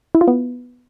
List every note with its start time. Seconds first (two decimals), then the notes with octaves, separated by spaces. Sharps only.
0.15 E4
0.21 F4
0.28 B3